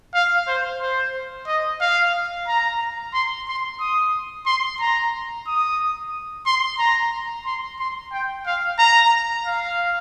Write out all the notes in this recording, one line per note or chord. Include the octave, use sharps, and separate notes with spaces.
F5
C5
C5
D#5
F5
A#5
C6
C6
D#6
C6
A#5
D#6
C6
A#5
C6
C6
G5
F5
A#5
F5